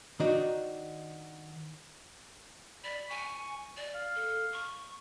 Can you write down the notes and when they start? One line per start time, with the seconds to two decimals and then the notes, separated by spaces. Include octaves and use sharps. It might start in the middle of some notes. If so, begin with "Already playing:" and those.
0.20 D#3 D4 D#4 F#4
2.84 D5 B5
3.10 G#5 C#6
3.77 D5
3.95 F5
4.16 A4
4.52 C#6